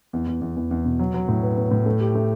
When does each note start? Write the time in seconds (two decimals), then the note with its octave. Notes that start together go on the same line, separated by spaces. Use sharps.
0.13 E2
0.27 E2
0.42 E2
0.56 E2
0.71 E2
0.85 B2
0.99 F#3
1.14 F#3
1.28 A2
1.43 B3
1.57 B3
1.71 A2
1.86 A3
2.00 G4
2.15 A3